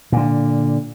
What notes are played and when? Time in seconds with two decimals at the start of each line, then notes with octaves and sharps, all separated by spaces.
0.12 A#2 D3